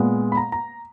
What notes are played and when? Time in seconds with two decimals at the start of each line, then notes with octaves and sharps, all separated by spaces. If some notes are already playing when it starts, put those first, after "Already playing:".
Already playing: A#2 G#3 B3
0.32 B5
0.37 A#5
0.52 A#5